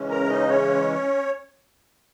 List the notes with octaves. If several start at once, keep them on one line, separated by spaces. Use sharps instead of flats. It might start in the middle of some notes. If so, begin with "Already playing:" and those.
Already playing: C#3 E3 G#3 C#4
A#4 A#5
D#4 D#5
C#4 C#5